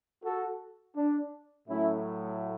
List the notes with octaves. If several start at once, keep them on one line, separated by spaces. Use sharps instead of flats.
F#4 A4
D4
A2 F#3 A3 C#4 E4